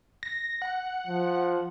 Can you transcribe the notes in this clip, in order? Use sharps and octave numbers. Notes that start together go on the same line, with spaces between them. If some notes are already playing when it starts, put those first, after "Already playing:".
A#6
F#5
F3